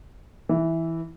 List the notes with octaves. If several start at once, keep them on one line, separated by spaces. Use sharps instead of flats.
E3